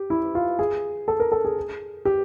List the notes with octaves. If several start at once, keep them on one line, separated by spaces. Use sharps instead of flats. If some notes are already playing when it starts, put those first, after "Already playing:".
Already playing: G4
E4
F4
G#4
A4
A#4
A4
G#4
G4